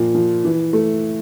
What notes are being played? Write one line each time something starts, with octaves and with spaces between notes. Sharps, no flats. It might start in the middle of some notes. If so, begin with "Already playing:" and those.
Already playing: A#2 F3
F3
E3
A3